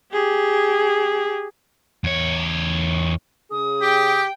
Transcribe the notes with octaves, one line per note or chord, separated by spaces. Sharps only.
G4 G#4
E2 C#5
C#3 G#4 D#6
G4 G5